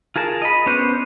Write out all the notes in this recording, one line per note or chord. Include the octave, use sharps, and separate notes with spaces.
F4 G#4 A#4 A5
D#5 B5
B3 C#4 D4 C5